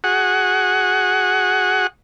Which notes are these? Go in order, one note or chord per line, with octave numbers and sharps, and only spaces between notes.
F#4 G#4 F#5